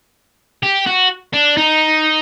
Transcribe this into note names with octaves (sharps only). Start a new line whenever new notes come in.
G4
F#4
D4
D#4